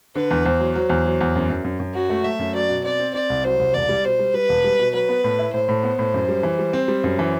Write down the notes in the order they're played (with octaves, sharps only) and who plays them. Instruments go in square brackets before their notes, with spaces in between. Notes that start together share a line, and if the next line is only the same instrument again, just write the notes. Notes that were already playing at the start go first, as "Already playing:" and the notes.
[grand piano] D3 [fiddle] B4
[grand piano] E2
[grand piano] E2 [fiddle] C5
[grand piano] F#3
[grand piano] F#3 [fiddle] C5
[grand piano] E2
F#3
E2
F#2
F#2
F#2
F#2
[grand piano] F#3 [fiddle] F#4
[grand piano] A3
[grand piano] A3 [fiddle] E5
[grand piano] F#2
[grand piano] F#3 [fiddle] D5
[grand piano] B2
[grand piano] C4 [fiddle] D5
[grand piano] C4
[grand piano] C4 [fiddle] D5
[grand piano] C2
[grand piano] F#3 [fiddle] C5
[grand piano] C2
[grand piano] E1 [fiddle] D5
[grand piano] G3
[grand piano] B2 [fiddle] C5
[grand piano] G3
[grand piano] G3 [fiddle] B4
[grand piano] E1
G3
B2
[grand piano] F#3 [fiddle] B4
[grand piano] B3
A2
E4
[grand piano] A2 [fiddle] C5
[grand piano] A2
B3
A2
F#2
G3
E3
G3
C4
G3
F#2
E3